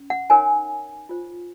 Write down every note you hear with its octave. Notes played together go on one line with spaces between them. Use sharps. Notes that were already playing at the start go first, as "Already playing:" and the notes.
Already playing: C#4
F#5
D#4 A#4 C#5 G#5
F4 C5